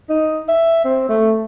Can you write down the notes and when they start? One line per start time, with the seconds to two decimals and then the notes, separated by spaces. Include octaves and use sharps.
0.09 D#4
0.48 E5
0.85 C4
1.09 A3